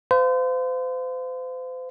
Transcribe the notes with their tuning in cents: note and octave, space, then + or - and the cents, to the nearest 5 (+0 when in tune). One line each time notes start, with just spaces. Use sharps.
C5 -40 F5 +0